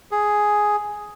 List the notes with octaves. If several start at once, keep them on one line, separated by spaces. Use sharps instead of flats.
G#4